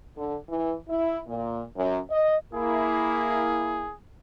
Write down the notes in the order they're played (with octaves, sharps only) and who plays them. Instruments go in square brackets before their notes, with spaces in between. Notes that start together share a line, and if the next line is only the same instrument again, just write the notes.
[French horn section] D3
E3
E4
A#2
F#2
D#5
[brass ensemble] A#3 E4 [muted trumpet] G#4